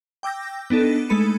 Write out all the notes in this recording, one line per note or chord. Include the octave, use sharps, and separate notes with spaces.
G5 D6 E6 G6 A#6
B3 D4 D#4 A4
G#3 A3 A4 B5 C#7 D#7